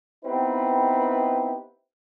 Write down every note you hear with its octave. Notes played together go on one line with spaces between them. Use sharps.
B3 C4 D#4 E4 G4 B4